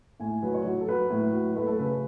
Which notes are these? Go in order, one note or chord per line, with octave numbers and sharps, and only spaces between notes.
A2 G#5
F#3 B4
C#5
F#3
A4
F#3 B4
A2
F#3
A3 B4
A4
C#3 B4